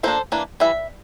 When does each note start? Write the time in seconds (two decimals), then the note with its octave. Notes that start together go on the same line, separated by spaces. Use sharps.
0.03 F3 A#3 D4 A4 C5
0.32 E3 A#3 D4
0.60 E3 G3 E5